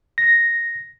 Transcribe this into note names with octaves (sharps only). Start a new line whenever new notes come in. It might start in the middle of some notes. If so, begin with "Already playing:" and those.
A#6